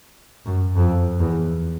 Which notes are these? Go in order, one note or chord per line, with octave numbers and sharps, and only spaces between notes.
F#2
F2
E2